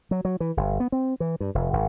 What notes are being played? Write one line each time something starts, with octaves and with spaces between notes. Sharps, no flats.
F#3
F#3
E3
G1
B3
C4
E3
G2
F1
G#1